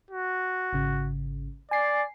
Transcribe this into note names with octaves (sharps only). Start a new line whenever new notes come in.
F#4
G#1 C#3
D5 G#5 C7